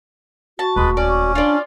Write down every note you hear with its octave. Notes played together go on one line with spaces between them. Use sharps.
F#4 A5
D#1 D2 G#3 B4
C#4 D5
D4 F4 D5